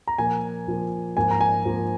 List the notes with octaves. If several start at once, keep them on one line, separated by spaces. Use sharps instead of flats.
A#5
A#2 F3 A#3 G#5
A#2 F3 A#3
G#2 F3 A#3 G#5
A#5
G#5
G#2 F3 A#3